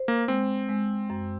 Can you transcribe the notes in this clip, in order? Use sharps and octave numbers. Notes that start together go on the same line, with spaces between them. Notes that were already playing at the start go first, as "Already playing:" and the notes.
Already playing: C5
A#3
G#3 C4
G#3
F#2